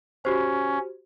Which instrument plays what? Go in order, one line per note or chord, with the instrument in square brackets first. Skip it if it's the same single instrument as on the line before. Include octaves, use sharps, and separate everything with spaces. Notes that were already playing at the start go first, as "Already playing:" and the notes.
[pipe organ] C#4 [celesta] F#4 G4 C5